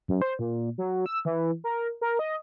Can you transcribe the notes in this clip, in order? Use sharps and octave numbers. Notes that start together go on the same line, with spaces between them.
F#2
C5
A#2
F#3
E6
E3
A#4
A#4
D#5